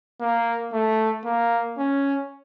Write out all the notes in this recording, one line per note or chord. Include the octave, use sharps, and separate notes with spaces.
A#3
A3
A#3
C#4